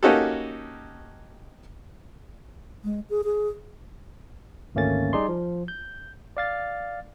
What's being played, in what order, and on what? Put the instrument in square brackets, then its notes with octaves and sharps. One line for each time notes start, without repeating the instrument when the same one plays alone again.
[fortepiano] A#3 C#4 D#4 F#4 G4 A4
[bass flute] G#3
G#4
G#4
[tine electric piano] G#1 D2 A3 A#3 C#4 A6
G3 D#4 G#4 D5 C6
F3
G6
D5 F5 A6